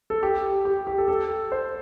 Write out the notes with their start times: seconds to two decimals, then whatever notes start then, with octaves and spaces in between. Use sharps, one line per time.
0.10 A4
0.23 G4
0.65 G4
0.87 G4
0.98 A4
1.08 A4
1.52 C5